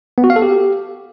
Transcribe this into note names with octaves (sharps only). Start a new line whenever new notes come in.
B3
F#4
F5
A4
G4